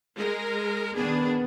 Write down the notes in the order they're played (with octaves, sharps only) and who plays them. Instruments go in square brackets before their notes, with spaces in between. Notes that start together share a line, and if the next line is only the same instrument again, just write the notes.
[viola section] G#3 A#4
[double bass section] D#3 B3 [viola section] D4 G#4